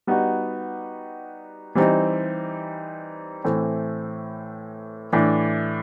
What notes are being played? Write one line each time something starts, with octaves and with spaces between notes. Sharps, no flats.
G3 B3 D#4 F#4
E3 G3 C4 D#4
A2 E3 A3 C4
A2 E3 D4